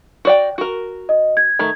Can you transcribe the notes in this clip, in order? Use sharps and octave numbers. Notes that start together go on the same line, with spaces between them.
F#4 D5 G5
F#4 A#4
D#5
G#6
D#3 A3